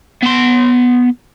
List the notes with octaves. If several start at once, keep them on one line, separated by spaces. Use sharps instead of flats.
B3 C6